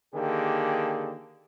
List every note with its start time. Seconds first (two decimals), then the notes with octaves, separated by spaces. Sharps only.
0.15 D3 D#3 A#3 G4 G#4